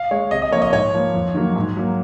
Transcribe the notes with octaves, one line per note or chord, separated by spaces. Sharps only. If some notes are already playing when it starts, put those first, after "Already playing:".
Already playing: F5
G#3 C#5
C3 D#5
D#5
F3 A#3 C#5
D#5
G#2 C#5
F3 A#3
F2
D#3 F#3 A#3
G#2
F#3 A#3